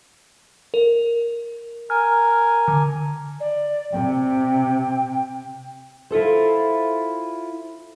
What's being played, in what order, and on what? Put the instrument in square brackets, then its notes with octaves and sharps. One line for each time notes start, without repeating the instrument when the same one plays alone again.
[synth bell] A#4
[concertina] A#4 G#5 [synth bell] F6
[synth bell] D3
[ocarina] D5
[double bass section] C3 [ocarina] G5
[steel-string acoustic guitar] E4 F4 A4 C5